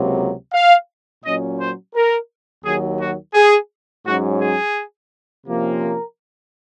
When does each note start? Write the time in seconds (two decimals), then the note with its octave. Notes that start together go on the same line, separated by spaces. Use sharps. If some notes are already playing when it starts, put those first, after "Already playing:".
Already playing: C#2 C3 F#3 A#3
0.53 F5
1.23 A#2 F#3 C#4 D#5
1.60 C5
1.95 A#4
2.65 D#2 D#3 F#3 G#4
3.00 F#4
3.34 G#4
4.05 G#2 F#3 C#4 F#4
4.41 G#4
5.46 C3 F3 A#3 C#4
5.82 A#4